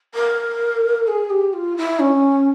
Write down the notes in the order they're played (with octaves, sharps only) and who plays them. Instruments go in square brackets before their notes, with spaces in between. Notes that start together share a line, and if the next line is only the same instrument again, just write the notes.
[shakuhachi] A#4
G#4
G4
F4
E4
C#4